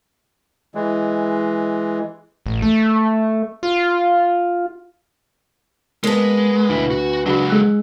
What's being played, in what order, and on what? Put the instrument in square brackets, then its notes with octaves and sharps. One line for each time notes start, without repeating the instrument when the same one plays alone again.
[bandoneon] E3 G#3
[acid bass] A1
A3
F4
[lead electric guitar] G#3 [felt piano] A#3 A5 [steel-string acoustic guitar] B3 B4
[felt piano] D2 [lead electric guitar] B2 E4
[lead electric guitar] F#4
[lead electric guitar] C#2 F#3 [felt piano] D4 F#4 B5
[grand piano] G#3 F#6 [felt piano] E6